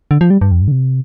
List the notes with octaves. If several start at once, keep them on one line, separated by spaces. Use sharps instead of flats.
D3
F3
G3
G2
F2
G2
D3
C3